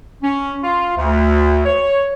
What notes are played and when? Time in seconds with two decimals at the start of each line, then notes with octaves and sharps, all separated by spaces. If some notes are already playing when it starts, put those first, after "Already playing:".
0.23 C#4
0.62 F4
0.96 D2
1.66 C#5